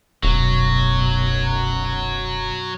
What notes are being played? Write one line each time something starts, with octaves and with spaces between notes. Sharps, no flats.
D#1 B1 F#2 B2 F#3